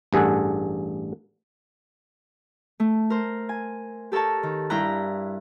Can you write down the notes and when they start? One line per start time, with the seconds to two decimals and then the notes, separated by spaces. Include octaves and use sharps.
0.13 A1 G2 G#4 A4 F#5
2.80 A3
3.10 A#4 C5
3.49 G#5
4.12 G4 A4 A#4 C#5 A5
4.43 D#3
4.70 G2 D4 E4 G5 A#5 F#6